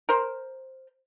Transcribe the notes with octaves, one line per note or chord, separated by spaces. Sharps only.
A#4 C5